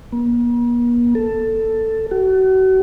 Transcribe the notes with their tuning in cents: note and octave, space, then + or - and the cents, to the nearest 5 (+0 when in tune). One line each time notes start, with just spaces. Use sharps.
A#3 +45
A4 +10
F#4 +35